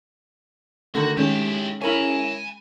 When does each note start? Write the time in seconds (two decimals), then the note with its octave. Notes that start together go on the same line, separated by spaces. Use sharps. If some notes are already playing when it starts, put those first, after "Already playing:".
0.95 D3 D#3 A3 F#4 A#4
1.17 D#3 G#3 C#4 E4 G4 G#4
1.82 E4 A#4 C#5 G#5 B5